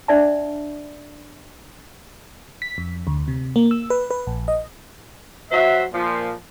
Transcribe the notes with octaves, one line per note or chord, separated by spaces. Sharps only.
D4 D5 E5 A5
B6
F2
D2
C3
A#3
E6
B4
B4
A#1
D#5
F#3 F#4 C5 E5
A#2 F3